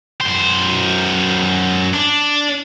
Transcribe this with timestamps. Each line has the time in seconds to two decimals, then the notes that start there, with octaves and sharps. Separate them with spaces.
0.21 F#2 C5
1.94 D4